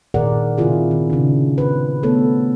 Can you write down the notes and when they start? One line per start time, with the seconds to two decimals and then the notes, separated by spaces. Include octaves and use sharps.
0.14 A#2 D#3 G#4 A#4 D5 F#5
0.58 C3 D#3 A#3 E4 F4 G#4
0.91 D#3
1.10 C#3 D4
1.58 B4 C5
2.03 A3 B3 A4 C#5